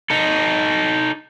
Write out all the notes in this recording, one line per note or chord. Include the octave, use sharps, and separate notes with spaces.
D#4 A4